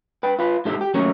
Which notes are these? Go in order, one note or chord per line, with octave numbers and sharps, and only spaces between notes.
B4 G5
F4 B4
G#2 G4 A4 C5 E5
G4
D#2 F#3 A3 C#4 A#4 C#5